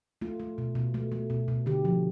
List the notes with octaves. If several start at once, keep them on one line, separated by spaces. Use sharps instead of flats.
A3 F4
A3
B2
B2
A3
A3
B2
B2
D3 G4
F3